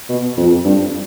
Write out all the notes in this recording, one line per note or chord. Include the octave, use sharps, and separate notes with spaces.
B2
F2
G2